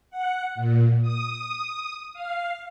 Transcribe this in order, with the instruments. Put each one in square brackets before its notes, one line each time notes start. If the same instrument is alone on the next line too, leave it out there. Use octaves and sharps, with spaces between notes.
[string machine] F#5
A#2
D#6
F5